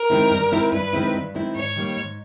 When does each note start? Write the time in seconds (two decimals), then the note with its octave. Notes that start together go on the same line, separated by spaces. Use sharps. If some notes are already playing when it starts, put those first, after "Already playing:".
Already playing: A#4
0.10 D#3 G#3 C4 E4
0.31 G2
0.52 D#3 G#3 C4 E4
0.72 G2 B4
0.93 D#3 G#3 C4 E4
1.14 G2
1.34 D#3 G#3 C4 E4
1.55 G#2 C#5
1.76 D#3 G3 A#3
1.97 G#2